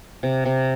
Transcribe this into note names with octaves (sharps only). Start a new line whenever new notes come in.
C3
C3